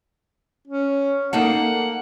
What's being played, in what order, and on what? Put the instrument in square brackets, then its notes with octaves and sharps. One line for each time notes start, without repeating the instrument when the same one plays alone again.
[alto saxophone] C#4
[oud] A#3 D#4 A4 [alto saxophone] F#5